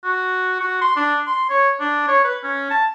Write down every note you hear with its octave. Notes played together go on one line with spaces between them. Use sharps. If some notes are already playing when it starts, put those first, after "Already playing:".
F#4
F#4
C6
D4
C6
C#5
D4
C#5
B4
C#4
A5